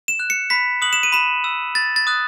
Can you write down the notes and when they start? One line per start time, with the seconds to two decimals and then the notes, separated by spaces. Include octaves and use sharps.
0.08 E7
0.20 F#6
0.30 C#7
0.50 B5 B6
0.82 D#6 F#6 F#7
0.93 E7
1.03 D#7
1.12 B5 E7
1.44 E6
1.75 B5 A6
1.96 A6
2.07 D#6 F#6